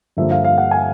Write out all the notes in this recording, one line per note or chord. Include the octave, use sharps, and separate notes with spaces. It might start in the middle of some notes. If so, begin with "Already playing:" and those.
G2 D3 F3 A#3 E5
F5
F5
F#5
G#5